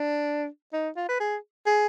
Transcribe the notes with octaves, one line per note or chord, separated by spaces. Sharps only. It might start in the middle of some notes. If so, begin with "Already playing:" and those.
Already playing: D4
D#4
F4
B4
G#4
G#4